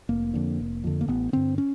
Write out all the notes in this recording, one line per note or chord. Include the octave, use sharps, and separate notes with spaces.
F1 A#3
F2 D3
F1
F2 D3
A#3
A1 B3
G2 D3 C4
C#4